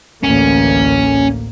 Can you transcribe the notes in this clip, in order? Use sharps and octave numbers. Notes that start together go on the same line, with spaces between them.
A1 D2 A#3 C#4